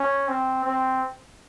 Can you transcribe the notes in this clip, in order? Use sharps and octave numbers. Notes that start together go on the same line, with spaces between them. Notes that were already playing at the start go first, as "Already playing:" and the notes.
Already playing: C#4
C4
C4